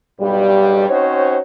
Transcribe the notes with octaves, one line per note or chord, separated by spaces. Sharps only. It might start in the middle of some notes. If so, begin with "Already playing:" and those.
B1 G2 G3
C4 C#4 D#4 F#4 C5 C#5